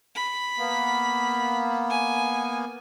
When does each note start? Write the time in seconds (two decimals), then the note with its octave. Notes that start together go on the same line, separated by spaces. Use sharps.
0.15 B5
0.58 A#3 B3
1.90 G#5